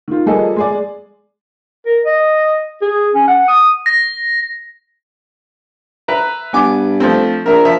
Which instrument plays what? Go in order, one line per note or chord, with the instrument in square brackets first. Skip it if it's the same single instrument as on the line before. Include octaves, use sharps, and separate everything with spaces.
[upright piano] D#3 F4
F3 G3 A#3 G#4 A4 D#5
G#3 G#4 D5
[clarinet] A#4
D#5
G#4
C#4
F#5
D#6
[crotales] A#6
[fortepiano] B4 E5 A#5
[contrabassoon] G2 [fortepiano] B3 G#5 D6
[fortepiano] F3 A3 C4
[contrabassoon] A#1 [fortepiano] A#4 E5 A#5
[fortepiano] F3 E5